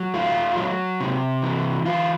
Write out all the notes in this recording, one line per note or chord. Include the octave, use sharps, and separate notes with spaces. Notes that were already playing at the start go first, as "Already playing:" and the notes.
Already playing: F#3
A3 F4
F#3
C3
E3
E3 F4